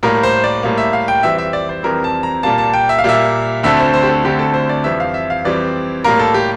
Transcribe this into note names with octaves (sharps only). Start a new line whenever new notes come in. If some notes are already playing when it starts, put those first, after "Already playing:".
A2 G3 A#3 A#4
C5
D5
A2 G3 A#3
E5
F5
G5
F2 E3 G3 C4 E5
E5
D5
C5
F2 E3 G3 C4 A#4
A5
A#5
A#2 G3 A#3 A5
A5
G5
E5
F5
A#2 G3 A#3 E5
D2 D3 A3 C4 E5
C5
C5
G4
A4
D2 D3 A3 C4 G4
A4
C5
D5
F2 E3 G3 C4 E5
F5
E5
F5
F2 E3 G3 C4 D5
A2 G3 A#3 A#4
A4
G4